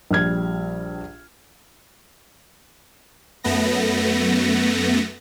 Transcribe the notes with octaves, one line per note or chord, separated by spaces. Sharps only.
A#1 G3 F6 G#6
F#2 A3 B3 A#6